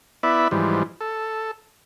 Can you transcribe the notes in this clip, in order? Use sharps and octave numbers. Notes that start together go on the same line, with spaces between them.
B3 E4 D5 E5 B5
G#2 E3 F3 G3
A4